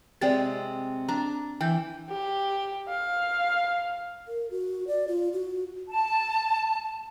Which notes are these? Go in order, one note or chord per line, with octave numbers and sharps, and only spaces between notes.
C3 G#3 C4 D5 G5 A6
D4 A#5
E3 G5 G6
G4
F5
A#4
F#4
D5
F4
F#4
A5